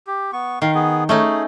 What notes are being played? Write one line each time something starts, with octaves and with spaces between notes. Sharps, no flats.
G4
B3 C#6
D#3 F5
B3 G#4
A3 C#4 D#4 G#4